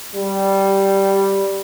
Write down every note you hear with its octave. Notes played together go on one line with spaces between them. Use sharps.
G3